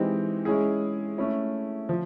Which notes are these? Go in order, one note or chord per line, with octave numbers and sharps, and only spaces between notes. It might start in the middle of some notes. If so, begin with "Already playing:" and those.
Already playing: E3 G#3 C4 D#4 G4
G#3 C#4 E4 G#4
A3 C#4 E4
F3